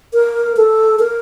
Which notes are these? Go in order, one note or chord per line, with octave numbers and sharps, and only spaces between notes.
A#4
A4
A#4